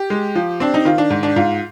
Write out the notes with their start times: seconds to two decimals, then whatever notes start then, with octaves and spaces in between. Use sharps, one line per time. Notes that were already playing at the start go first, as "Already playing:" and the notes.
Already playing: G4
0.10 G#3
0.35 F3
0.60 C4 D4
0.74 D#4
0.85 D#3 F4
0.98 D4
1.10 G#2
1.23 D4
1.36 G#2 F4